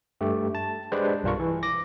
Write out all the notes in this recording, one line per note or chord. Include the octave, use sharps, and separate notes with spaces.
G2 A3 G4
A5
G#3 D4 G4 G#4 B4 C5
B1 G2 D4 F4 A#4 C#6
E3
D6 A#6